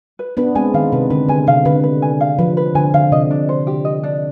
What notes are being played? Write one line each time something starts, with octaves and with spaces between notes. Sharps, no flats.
B4
B3 D4 B4
G#3 C4 G#5
D#3 F5
C3 B4
D3 B4
D3 G#5
C3 F5
D3 B4
B4
G#5
F5
F3 B4
B4
D3 G#5
D3 F5
C3 D#5
D4
C5
G4
D#5
D4